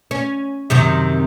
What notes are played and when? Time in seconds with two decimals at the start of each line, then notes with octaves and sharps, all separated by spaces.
0.11 C#4
0.70 F#2 C3 D#3